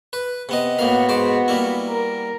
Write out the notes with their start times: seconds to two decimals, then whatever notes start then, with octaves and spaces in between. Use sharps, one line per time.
0.13 B4
0.49 C3 B3 D#5
0.79 A2 A#3 B3 F#4 F5
1.09 G#2 C5 D6
1.48 G3 A#3 E4
1.89 A#4